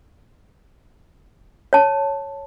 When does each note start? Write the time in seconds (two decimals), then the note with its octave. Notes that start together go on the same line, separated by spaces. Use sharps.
1.73 C#5 A5